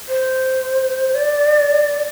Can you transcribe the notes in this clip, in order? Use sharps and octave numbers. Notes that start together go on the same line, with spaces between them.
C5
D5